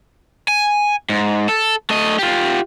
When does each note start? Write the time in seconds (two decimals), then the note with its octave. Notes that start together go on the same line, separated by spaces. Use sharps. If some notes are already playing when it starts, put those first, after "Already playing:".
0.48 G#5
1.09 G#2
1.49 A4
1.90 A3 D#5
2.19 F4 G4